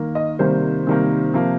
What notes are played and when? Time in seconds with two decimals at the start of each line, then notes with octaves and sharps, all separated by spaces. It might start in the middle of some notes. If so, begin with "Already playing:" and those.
Already playing: D#3 A#3
0.15 D#5
0.39 C3 D#3 G3 A#3 C5
0.87 C3 D#3 G3 A#3
1.34 C3 F3 A#3